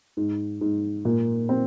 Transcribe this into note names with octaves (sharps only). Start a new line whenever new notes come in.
G#2
G#2
A#2
C4